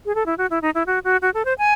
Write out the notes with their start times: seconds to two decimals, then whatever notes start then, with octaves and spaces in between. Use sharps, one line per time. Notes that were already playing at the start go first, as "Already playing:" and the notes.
0.06 G#4
0.15 A4
0.26 E4
0.38 F#4
0.50 E4
0.62 D#4
0.75 E4
0.86 F#4
1.04 F#4
1.22 F#4
1.34 A4
1.45 C5
1.58 G#5